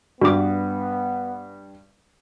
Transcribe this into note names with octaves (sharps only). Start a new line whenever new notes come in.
G2 B3 F#4 D6